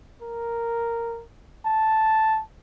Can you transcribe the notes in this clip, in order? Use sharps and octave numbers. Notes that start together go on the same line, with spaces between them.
A#4
A5